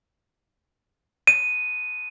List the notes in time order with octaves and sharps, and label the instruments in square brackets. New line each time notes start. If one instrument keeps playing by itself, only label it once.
[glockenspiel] D#7